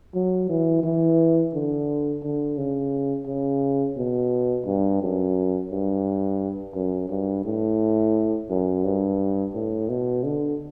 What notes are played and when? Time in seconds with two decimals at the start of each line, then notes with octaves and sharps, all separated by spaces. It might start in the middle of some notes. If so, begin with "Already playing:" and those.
0.14 F#3
0.49 E3
0.83 E3
1.54 D3
2.23 D3
2.57 C#3
3.27 C#3
3.97 B2
4.66 G2
5.02 F#2
5.71 G2
6.75 F#2
7.09 G2
7.45 A2
8.50 F#2
8.84 G2
9.54 A2
9.89 B2
10.24 D3